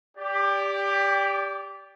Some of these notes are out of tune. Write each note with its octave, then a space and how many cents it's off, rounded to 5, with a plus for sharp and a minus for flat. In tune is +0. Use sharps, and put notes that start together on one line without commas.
G4 +15 D5 -20